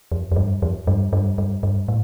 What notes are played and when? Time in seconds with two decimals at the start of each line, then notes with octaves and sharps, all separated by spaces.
0.12 F2
0.32 F2
0.36 G2
0.62 F2
0.87 G2
1.13 G2
1.38 G2
1.63 G2
1.88 A2